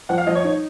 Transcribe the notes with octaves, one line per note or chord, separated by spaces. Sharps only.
F3 F#5
F5
F3 D#5
C#5
D#4